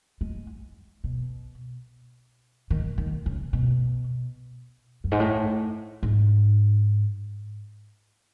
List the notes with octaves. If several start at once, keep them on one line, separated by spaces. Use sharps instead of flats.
G#3
B2
D#3
D#3
C#3
B2
F#2
G#2
A2
G#2